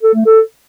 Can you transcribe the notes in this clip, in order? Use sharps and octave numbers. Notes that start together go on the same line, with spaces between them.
A4
A3
A4